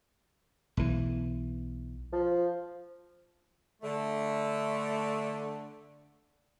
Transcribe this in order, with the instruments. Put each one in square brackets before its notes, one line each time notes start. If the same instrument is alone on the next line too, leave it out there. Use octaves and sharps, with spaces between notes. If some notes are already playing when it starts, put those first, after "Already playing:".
[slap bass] B1 E3
[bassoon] F3
[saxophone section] D3 A3